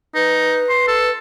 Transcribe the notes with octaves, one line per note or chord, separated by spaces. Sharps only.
D#4 B4
C6
A4